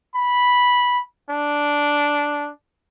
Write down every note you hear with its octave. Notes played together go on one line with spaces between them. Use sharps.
B5
D4